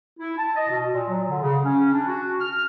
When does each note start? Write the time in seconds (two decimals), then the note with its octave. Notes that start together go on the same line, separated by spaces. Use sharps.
0.20 E4
0.37 A5
0.55 D#5
0.69 B2
0.93 A#2
1.09 F#3
1.28 D3
1.42 C#3
1.64 C#4
1.93 D4
2.06 F#4
2.40 F6